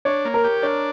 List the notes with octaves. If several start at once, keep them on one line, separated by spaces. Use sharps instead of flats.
D4 C#5
A#3
A#4
G4
D4 C#5